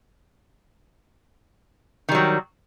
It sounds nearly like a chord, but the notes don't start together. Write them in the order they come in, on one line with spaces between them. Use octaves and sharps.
D#3 G3 F#3